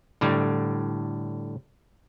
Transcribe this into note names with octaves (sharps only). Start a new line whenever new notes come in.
A2 D3 G3